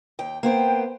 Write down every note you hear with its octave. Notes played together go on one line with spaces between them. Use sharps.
D#2 G5
A#3 B3 C5 G5